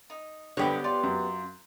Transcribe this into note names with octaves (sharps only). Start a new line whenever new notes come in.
D#4
G2 D3 B3 G4 C#5 D#5 F5 B5
F4 D5
F#2